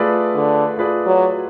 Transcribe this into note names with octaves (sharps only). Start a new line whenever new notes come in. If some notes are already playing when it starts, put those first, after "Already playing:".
Already playing: A3 F4 G#4 B4 D5
D3
A3 F4 G#4 B4 D5
F#3